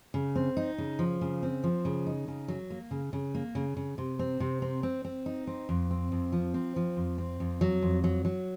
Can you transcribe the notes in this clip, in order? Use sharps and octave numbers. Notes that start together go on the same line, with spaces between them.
C#3
C4
D#4
C#3
F3
C#3
C4
F3
C#3
D#4
C#3
F#3
A#3
C#3
C#3
A#3
C#3
C#3
C3
C4
C3
C4
C4
C4
D#4
C4
F2
C4
F2
F3
C4
F3
F2
C4
F2
F#3
F2
F#3
F#3